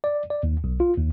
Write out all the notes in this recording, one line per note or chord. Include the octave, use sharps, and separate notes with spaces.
D5
D5
D#2
B1
F4
D#2